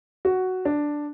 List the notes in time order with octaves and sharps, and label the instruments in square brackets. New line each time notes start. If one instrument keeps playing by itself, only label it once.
[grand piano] F#4
D4